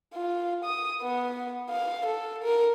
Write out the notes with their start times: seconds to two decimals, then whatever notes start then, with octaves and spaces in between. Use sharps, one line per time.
0.14 F4
0.65 D#6
1.02 B3
1.70 F5
2.06 A4
2.43 A#4